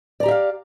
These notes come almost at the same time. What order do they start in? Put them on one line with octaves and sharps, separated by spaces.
D5 A#5 G4 E5 F5